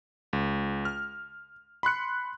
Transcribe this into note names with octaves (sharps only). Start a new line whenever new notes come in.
C#2
F6
B5 C6 F#6 C#7